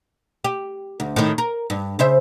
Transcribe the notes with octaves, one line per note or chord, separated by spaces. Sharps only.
G4
D2
A2 D#3
A#4
G2
C#3 C5 E5